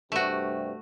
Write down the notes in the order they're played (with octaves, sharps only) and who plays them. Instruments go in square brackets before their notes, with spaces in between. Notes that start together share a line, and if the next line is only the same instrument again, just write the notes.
[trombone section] G2 C3 [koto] A3 F#4